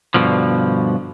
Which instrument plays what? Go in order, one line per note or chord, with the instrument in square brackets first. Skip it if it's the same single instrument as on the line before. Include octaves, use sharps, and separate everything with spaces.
[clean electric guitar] G2 B2 D3 F3